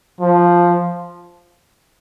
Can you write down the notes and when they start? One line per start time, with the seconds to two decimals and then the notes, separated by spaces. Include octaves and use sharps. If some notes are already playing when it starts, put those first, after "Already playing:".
0.21 F3